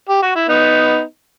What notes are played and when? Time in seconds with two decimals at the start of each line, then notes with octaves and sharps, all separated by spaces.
0.09 G4
0.23 F#4
0.36 E4
0.49 B3 D#4